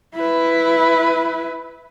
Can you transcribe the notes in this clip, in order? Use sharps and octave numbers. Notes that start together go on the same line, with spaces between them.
E4 B4